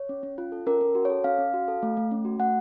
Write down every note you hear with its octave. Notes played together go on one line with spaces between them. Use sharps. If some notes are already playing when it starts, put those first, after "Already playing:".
Already playing: C#5
C#4
C#4
F4
A4
C#4 A#4
C#4
F#4
A4 C#5
C#4 F5
C#4
F#4
A4
A3
A3
C#4
F#4
A3 F#5